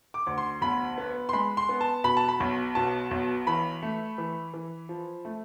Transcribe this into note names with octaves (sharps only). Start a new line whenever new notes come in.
D6
D2
C6
B1 B5
B3
C6
G#3 B5
C6
B3
A5
B2 B5
A5
B5
B1
B2 A5
B1
E3 B5
A3
E3
E3
F3
A3